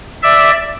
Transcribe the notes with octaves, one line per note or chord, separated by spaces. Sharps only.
D5 E5